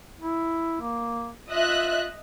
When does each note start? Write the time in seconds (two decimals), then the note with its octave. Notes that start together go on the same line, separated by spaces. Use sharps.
0.20 E4
0.81 A#3
1.49 F4 D#5 E5 F#6